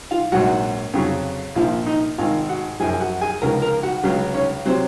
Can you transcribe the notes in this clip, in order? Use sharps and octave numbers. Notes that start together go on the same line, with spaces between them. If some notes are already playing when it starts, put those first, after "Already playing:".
F4 F5
A#1 G#2 F#3 F#4 F#5
F2 C#3 F#3
A#1 A#2 F3 F4 F5
D#4 D#5
G#1 G#2 D#3 F4 F5
F#4 F#5
F#2 F3 G#4 G#5
G#5
F#4 F#5
G#4 G#5
C#2 C#3 F3 A#4 A#5
A#4 A#5
F#4 F#5
C#2 C#3 F#3
C#4 C#5
C3 F#3 C4 C5